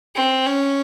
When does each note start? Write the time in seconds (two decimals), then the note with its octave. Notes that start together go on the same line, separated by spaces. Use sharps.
0.15 C4
0.46 C#4